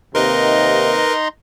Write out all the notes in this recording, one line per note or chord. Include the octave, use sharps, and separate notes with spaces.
D#2 C3 D#4 A#4 B4 D#5 A#5 C6